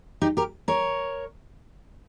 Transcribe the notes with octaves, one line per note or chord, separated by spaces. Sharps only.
D#4 G4
G4 A#4
A#4 C#5